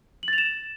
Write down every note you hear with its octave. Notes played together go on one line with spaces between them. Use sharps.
F#7
A6
F7
E7